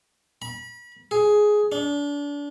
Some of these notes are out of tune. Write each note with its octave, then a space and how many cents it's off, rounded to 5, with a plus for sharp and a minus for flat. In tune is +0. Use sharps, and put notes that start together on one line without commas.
B5 -35
G#4 +10
D4 -30